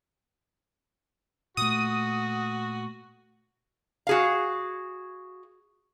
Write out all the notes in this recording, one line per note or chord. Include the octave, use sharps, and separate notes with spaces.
A#2 A3 F#4 D#6
F#4 G#4 F5